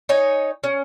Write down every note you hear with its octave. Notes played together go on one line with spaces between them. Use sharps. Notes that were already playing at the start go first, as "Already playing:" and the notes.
D#4 C#5 G#5
C#4